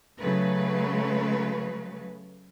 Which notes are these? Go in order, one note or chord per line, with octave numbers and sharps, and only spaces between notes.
C#3 F#3 A3 B4